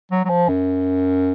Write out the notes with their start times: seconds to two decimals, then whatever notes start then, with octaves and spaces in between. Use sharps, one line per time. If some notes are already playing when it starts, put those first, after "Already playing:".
0.11 F#3
0.25 F#3
0.29 F3
0.48 F#2